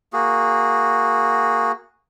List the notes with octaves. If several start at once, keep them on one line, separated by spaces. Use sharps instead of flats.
A#3 F#4 G#4